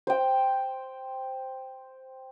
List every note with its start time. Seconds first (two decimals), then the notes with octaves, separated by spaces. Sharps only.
0.07 C5 G5